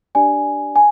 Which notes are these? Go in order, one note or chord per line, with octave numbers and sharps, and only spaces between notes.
D4 G4 D5 G#5
G#5